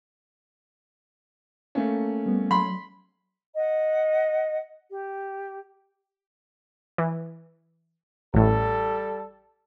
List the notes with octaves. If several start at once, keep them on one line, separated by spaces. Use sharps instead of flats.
A3 A#3 C#4
G3 B3
F#3 B5 C6
D#5 F#5
G4
E3
A1 A2 G3 A4